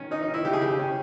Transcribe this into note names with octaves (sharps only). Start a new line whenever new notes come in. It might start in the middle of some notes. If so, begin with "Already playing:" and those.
Already playing: D#3 C#4
C#4 D#4
D#4
D#3
E4
C#3 G4
G#4
C#3 G4
C#4